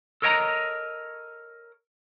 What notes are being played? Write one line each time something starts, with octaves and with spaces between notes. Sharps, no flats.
A4 A#4 C#5 D#5 G5 A#5